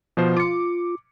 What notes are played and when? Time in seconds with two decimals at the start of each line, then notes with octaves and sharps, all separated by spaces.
0.17 B2 F3 C5
0.36 F4 D6 C#7